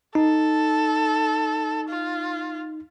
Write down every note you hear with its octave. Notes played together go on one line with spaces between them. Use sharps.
D#4 A4
F4